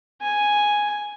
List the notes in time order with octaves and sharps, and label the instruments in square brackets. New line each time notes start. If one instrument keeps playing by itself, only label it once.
[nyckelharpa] G#5